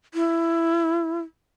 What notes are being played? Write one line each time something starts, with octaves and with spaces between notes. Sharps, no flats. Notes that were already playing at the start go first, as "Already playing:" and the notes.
E4